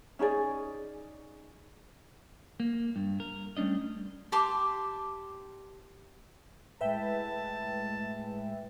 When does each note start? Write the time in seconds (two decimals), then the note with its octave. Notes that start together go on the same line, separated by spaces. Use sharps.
0.19 C#4 D#4 G#4 D5
2.60 A#3
2.96 G2
3.20 A#4
3.57 G3 A3 C#4 D4 D#5
4.32 G4 A5 C6 D6
6.81 A2 G#3 B4 E5 G5 A5